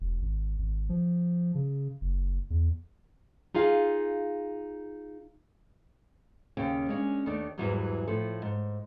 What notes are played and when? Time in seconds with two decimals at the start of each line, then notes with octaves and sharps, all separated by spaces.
0.01 E1
0.22 G#1
0.59 G#1
0.89 F3
1.55 C#3
2.01 F#1
2.50 E2
3.54 D#4 F4 G#4 F5
6.57 D#2 C#3 C#4 G5
6.89 G#3 C#4 D4
7.26 D#2 D#3 A3 D4 D5
7.58 E2 G#2 E3 F#3 G3
8.08 A2 F3 A4
8.42 G#2